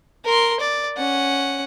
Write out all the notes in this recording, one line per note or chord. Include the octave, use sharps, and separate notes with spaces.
A#4 C6
D5
C#4 F#5